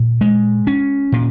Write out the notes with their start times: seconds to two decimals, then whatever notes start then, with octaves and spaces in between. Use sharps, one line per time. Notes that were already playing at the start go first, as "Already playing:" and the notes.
Already playing: A#2
0.21 G#3
0.67 C#4
1.12 A#2